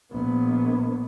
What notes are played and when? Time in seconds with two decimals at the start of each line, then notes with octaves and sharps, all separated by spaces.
0.11 A#1 B3